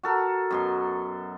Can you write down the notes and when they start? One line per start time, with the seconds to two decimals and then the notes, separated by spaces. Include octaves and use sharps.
0.03 F#4 A4 A#4
0.50 F#2 B2 C6